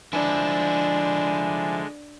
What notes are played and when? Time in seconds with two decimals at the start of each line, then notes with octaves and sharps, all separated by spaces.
0.13 D3 F3 G#3 D4 E4 G#5